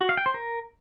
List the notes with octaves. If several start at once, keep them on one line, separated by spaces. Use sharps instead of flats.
F#4
F5
G5
C5
A#4